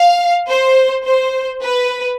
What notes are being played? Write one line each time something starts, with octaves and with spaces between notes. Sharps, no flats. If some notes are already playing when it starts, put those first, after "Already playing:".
Already playing: F5
C5
C5
B4